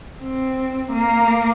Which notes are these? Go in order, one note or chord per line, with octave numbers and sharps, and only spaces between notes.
C4
A#3